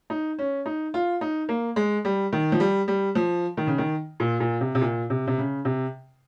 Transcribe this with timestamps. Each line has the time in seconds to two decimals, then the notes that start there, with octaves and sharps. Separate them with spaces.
0.10 D#4
0.39 C#4
0.66 D#4
0.94 F4
1.21 D#4
1.49 A#3
1.76 G#3
2.05 G3
2.33 D#3
2.52 F3
2.60 G3
2.88 G3
3.15 F3
3.57 D#3
3.67 C#3
3.78 D#3
4.20 A#2
4.40 A#2
4.61 C3
4.75 C3
4.81 A#2
5.10 C3
5.27 C3
5.38 C#3
5.65 C3